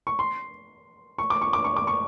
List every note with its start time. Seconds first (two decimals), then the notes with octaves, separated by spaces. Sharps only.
0.07 C#6
0.19 C6
1.18 C#6
1.30 D6
1.42 C#6
1.53 D6
1.64 C#6
1.76 D6
1.87 C#6